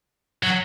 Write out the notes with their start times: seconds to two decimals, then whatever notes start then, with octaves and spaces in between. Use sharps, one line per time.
0.43 F#3